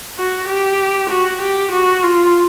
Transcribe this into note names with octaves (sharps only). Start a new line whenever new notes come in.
F#4
G4
F#4
G4
F#4
F4